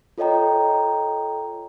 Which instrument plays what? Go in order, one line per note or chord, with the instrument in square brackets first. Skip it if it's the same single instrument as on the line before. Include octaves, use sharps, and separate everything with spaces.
[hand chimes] F4 A4 C#5 D#5 G5 A#5